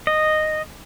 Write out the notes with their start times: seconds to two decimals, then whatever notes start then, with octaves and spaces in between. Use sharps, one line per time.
0.07 D#5